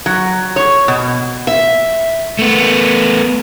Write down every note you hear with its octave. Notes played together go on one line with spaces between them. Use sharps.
F#3
C#5
B2
E5
A3 B3